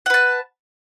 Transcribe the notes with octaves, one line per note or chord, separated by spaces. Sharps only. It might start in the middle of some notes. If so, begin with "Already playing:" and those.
B4 F#5 A5